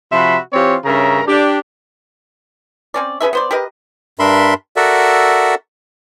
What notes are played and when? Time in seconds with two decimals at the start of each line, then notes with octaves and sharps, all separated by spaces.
0.12 C3 F3 F#4 E5 B5 C6
0.53 E3 C4 F4 G4 C5 C#5
0.85 G2 C#3 C#4 A#4 E5 A#5
1.27 D4 G4
2.94 C4 C#4 D5
3.20 C#4 G#4 B4 E5
3.33 B3 C5 D5
3.51 G4 A#4 B4 D#5
4.19 G2 D4 A#4 E5 B5 C6
4.76 F#4 A4 A#4 D5 E5 F#5